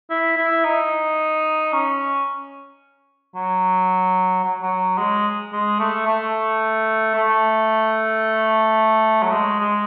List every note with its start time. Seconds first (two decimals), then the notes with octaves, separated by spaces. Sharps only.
0.10 E4
0.37 E4
0.64 D#4
1.73 C#4
3.35 F#3
4.44 F#3
4.62 F#3
4.98 G#3
5.53 G#3
5.79 A3
6.06 A3
7.15 A3
9.23 F#3
9.32 G#3
9.60 G#3